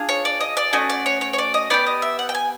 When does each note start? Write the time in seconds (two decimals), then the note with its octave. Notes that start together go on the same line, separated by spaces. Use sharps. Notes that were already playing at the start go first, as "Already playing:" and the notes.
Already playing: D4 F4 G#4
0.09 C#5
0.25 D5
0.41 D#5
0.57 D5
0.73 A3 C#4 F#4 D#5
0.90 D5
1.06 C#5
1.21 C#5
1.33 C#5
1.38 D5
1.54 D#5
1.70 B3 D#4 G4 D5
1.87 D#5
2.02 E5
2.19 F#5
2.29 G5
2.35 G#5